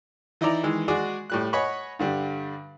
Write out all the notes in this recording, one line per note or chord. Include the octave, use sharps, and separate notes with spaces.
E3 D#4 E4 D5 A#5
D#3 E3 G#3
G#3 F#4 G#4 D5
A2 G3 F#6
C#5 D#5 F#5 G#5 B5 C#6
G2 D3 G3